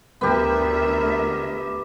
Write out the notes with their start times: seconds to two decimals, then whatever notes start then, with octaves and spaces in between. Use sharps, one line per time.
0.21 D2 B3 G4 A#4 E5